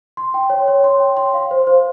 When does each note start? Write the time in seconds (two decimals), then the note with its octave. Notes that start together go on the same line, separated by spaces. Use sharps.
0.17 C6
0.34 G5
0.50 C#5
0.68 C#5
0.84 C6
1.00 G5
1.17 C6
1.34 F5
1.51 C5
1.67 C5